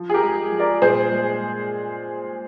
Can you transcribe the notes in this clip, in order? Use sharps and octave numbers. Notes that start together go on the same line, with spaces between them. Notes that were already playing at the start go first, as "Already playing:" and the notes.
Already playing: F3
G#4
G4 A#4
G#3
F3
A#4 D5
A#2 G#4 C5
G#3